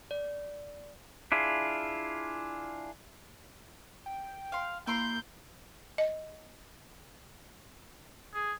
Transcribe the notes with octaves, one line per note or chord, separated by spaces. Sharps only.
D5
D4 E4 F4 G#4
G5
F5 C6
A#3 E4 A#5 C6 G6
D#5
G#4